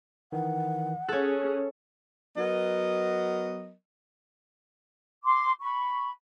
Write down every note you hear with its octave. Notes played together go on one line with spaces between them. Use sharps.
D#3 E3 F#5
C#4 G#4 A4 C#5 F#6
F#3 B3 A#4 D#5
C6 D6
B5 C#6